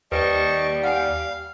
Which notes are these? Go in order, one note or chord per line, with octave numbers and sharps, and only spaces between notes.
D#2 G3 B4 C5 D#5 G5 A5 C#6
F5 F#5 G#5